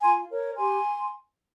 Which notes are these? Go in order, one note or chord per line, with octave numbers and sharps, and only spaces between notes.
F4 G#5 C6
A#4 C#5
G4 G#5 C6